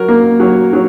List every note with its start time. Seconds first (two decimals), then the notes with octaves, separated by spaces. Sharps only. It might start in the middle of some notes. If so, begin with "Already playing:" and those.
Already playing: F#3 A#4
0.08 A#3
0.40 F#3
0.73 F#3